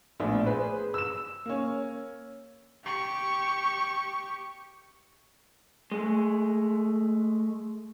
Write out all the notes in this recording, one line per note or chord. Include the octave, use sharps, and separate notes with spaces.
A#1 A2 B3 D4
G#4 B4 C5
E6 E7
A#3 C#4
G4 C#6
G#3 A3